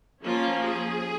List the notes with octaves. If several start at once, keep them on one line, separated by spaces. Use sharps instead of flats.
F3 A#3 C#4 F4
G#4